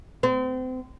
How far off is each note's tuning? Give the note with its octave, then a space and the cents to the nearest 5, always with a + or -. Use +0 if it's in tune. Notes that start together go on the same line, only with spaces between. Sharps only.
C4 -35